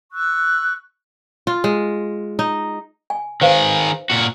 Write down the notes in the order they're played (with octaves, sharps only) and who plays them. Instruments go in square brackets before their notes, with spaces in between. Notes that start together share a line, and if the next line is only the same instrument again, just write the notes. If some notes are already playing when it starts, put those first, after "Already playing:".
[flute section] C#6 E6 F#6
[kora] F4
G#3
D#4
[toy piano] G#5
[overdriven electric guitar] D#3 G#4 [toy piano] B4 C5 F5
[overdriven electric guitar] A#2 F#4